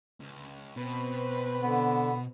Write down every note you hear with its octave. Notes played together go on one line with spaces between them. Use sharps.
C#2
B2 C4 B4
D3 B3